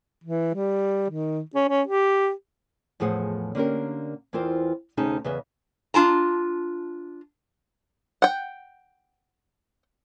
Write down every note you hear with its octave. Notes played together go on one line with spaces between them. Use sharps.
E3
G3
D#3
C#4
C#4
G4
E2 A2 F3 G#4 F#5 G#5
D3 A#3 C#4 G4 A#4
E2 E3 C4 F4 A#4 C5
D2 C3 C#4 D#4 G#4 A5
E2 C#3 B4 D#5 E5
D4 F4 A5 A#5
F#5 G5